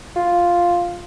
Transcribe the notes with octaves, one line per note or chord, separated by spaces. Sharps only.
F4